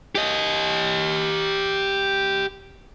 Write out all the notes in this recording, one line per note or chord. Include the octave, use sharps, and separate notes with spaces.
G4 D#5